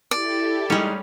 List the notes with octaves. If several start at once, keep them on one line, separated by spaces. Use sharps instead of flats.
E4 G4 A4 D5
A1 G3 G#3 C#4 D#4